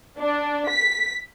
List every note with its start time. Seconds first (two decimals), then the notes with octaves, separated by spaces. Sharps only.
0.20 D4
0.69 B6